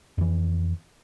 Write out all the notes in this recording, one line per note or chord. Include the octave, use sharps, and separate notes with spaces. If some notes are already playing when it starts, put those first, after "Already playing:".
F2 E3